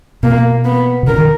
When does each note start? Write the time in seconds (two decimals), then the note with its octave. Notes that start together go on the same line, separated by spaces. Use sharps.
0.23 B2 A#3
0.65 B3
1.03 B2
1.07 C#3 A#4
1.18 D#3